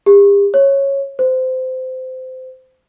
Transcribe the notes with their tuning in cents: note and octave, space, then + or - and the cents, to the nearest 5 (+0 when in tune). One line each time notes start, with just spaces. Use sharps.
G4 +40
C#5 -10
C5 -20